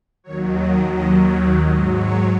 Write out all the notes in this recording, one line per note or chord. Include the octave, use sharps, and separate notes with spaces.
D#2 D#3 F#3 C#5
D#5
D#2 D#3 F#3 D#5
C#5
G#2 F#3 D#5
C#5